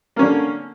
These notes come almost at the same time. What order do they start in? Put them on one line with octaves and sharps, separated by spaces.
A#3 C#4 D3